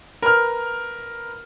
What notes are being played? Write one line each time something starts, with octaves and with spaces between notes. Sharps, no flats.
A#4 B4 F6